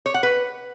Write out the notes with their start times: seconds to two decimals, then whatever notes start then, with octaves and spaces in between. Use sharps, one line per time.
0.06 C#5
0.14 F#5
0.23 B4